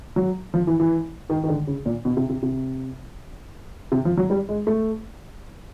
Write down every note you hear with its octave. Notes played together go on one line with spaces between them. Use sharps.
F#3
F3
E3
E3
D#3
D#3
D3
C#3
A#2
B2
C3
C3
C3
C3
F3
F#3
G3
G#3
A3